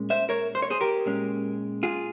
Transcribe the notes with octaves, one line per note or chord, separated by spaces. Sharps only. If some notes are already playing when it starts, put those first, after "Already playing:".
Already playing: A#2 G#3 C#4
C5 E5
A#4 C#5
C5
C#5
G#4 C5
G4 A#4
A#2 G#3 C#4
F4 G#4